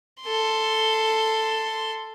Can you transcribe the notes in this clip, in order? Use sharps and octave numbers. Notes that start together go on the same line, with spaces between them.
A4 C6